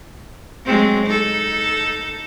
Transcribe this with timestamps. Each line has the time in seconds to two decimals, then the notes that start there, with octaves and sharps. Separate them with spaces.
0.64 F#3 G#3 C4
1.06 D#4 A4